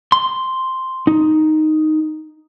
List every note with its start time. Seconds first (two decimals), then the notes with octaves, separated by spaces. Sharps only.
0.12 C6
1.07 D#4